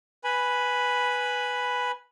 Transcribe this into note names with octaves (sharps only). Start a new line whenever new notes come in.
B4 G#5 B5